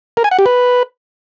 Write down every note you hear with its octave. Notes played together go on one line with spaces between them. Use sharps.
A#4
G#5
F#5
G4
B4